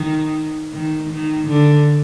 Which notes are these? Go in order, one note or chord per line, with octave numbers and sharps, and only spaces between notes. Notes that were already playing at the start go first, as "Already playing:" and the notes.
Already playing: D#3
D#3
D#3
D3